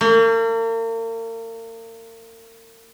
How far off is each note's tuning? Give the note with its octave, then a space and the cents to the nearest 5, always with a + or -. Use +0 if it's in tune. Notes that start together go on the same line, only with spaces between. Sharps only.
A#3 -40